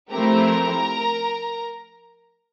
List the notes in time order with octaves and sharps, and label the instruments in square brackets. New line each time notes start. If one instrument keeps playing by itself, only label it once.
[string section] F3 A3 C4 E4 G4 [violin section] A#4 A#5